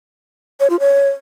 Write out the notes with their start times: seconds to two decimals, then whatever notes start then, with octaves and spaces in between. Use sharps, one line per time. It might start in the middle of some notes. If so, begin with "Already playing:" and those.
0.60 C#5
0.70 F4
0.80 C#5